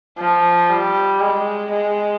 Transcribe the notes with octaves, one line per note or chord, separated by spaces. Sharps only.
F3
G3
G#3
G#3